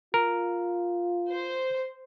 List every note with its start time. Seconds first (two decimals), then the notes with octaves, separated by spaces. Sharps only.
0.14 F4 A#4
1.29 C5